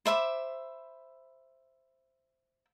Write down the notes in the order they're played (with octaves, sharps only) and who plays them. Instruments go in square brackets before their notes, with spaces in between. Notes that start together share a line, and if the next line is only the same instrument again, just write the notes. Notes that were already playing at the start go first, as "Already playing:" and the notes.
[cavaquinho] C5 E5 B5 D6